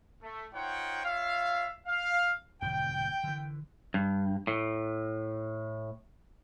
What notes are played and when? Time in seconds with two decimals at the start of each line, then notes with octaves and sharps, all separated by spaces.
0.22 A3
0.53 D#4 F4 C5 C#5 F#5 G5
1.04 F4 C#5 E5 F5
1.86 F5
2.62 E1 D2 G#2 G5
3.24 D3 E3
3.94 G2
4.47 A2